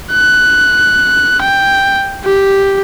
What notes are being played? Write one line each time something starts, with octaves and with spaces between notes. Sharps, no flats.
F#6
G5
G4